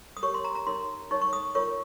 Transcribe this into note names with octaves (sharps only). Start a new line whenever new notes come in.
D#6
G4 A#4 C#5 C#6
C6
A#5
A#5
D#4 A#4 C#5 C6
D#4 A#4 C#5 C#6
C#6
D#6
F4 A#4 C#5 C#6